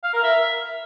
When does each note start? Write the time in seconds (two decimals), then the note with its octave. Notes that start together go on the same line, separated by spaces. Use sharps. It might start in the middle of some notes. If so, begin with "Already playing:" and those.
0.04 F5
0.13 A#4
0.23 E5